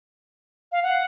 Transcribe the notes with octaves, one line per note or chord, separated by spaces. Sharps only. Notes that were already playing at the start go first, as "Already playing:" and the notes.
F5
F#5